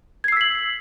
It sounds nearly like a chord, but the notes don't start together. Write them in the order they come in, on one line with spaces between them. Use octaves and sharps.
G#6 C7 E6 B6 F#7